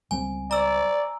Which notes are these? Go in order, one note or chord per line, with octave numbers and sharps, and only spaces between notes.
C#2 G3 C4 G#5
D5 A#5 E6